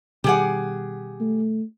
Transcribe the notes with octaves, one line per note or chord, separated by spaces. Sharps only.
B2 D#3 G3 G4 G#4 F#5
A3